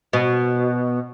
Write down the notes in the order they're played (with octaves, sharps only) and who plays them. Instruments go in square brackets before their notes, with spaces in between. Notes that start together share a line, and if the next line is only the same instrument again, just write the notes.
[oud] B2